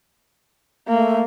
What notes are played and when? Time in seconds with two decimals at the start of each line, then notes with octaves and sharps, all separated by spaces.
0.88 A3 A#3